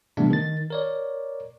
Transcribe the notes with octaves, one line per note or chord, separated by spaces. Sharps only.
C3 E3 G3 A3 B3 D4
D#3 A6
A#4 C#5 D5